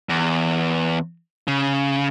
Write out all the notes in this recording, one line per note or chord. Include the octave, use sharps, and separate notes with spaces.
E2
C#3